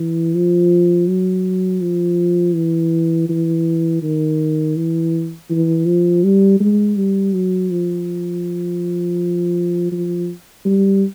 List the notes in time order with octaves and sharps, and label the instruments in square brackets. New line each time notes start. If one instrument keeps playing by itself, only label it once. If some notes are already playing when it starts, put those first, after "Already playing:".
Already playing: [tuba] E3
F3
F#3
F3
E3
E3
D#3
E3
E3
F3
G3
G#3
G3
F#3
F3
F3
G3